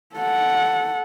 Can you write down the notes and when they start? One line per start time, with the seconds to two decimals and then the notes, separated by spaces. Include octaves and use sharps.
0.15 A4 F#5